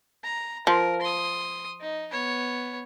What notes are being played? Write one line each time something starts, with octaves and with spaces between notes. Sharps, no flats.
A#5
F3 A#4
C6 D#6
D#4
B3 C#5